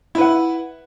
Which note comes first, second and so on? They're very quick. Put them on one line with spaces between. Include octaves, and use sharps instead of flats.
E4 B4 F#5